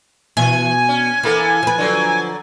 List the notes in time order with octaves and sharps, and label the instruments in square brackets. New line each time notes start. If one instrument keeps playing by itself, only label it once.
[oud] B2 [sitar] E3 [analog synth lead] G#5
[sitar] C#4
[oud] E3 [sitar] A#3 B3 A4
[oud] F3 B4
[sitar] D3 F#3